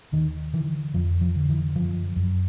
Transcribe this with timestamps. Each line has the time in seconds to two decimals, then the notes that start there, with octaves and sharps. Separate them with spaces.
0.12 D#2 D#3
0.54 D3 E3
0.94 F2 F3
1.21 F3
1.36 D3
1.49 E3
1.76 F#2 F3
2.16 F#2